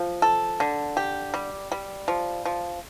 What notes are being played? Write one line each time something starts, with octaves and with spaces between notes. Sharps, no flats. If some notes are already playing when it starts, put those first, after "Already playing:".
Already playing: F3
A4
D3
G4
G3
G3
F3
F3